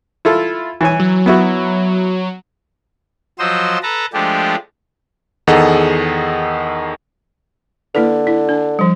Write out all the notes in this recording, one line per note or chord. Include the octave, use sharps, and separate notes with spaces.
E4 F4 A4
E3 C#5 G#5
F#3
B3 E4 F#4
F3 F#3 C5 D#5 E6
A4 B4 A5 A#5
F3 G#3 A3 D4 G4
E2 D#3 G#4 A4 D#5 F#5
D3 A#3 E4 B4
E4
D4
F3 G3